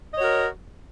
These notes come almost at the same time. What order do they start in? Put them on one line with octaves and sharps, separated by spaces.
D#5 C#5 F#4 A#4